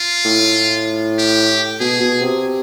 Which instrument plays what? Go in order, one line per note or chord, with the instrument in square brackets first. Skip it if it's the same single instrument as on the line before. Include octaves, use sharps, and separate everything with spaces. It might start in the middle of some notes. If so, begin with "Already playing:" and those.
Already playing: [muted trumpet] F4
[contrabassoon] A2
[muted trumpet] G4
[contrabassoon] B2 [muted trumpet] G#4
[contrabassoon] B2
C3